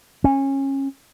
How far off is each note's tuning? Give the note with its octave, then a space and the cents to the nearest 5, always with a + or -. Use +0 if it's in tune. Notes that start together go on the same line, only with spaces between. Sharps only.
C#4 -25